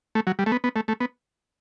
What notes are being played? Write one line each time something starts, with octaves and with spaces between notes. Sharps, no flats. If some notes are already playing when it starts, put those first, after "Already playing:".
A3
F#3
G3
A3
B3
B3
A3
A3
B3